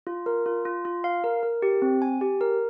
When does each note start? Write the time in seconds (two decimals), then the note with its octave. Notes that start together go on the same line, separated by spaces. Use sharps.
0.07 F4
0.26 A#4
0.46 F4
0.65 F4
0.85 F4
1.04 F5
1.24 A#4
1.43 A#4
1.62 G4
1.82 C4
2.02 G#5
2.21 G4
2.41 A#4